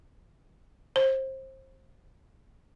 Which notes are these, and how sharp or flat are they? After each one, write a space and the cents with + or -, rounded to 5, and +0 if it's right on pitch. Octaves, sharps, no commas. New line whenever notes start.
C5 +25